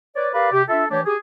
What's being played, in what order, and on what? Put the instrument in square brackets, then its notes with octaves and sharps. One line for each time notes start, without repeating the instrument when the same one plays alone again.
[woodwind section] B4 C#5 D5
G4 A#4 B4 D5 F5
C3 G4
D4 F4 A4 E5
E3 A3 D4 G4 C#5
G4 G#4